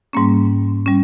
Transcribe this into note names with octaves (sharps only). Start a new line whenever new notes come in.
G#2 G3 A#3 C#4
G3 C#4